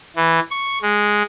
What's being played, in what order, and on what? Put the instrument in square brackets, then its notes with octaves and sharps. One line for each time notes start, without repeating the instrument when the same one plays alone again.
[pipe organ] E3
C#6
G#3